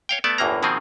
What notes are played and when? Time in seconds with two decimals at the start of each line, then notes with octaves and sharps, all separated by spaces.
0.09 C#5 F5 G5
0.24 A3 B3 D5 A5
0.38 G1 E2 A2 E3 A#3 A#5
0.63 B2 D#3 F3 A#3 C4 G#4